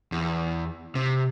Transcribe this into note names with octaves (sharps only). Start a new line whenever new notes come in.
E2
C3